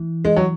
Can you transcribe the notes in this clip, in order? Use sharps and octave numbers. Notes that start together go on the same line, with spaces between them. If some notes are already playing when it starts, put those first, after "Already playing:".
Already playing: E3
G#3
F#3